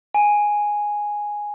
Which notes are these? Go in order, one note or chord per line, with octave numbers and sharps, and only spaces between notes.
G#5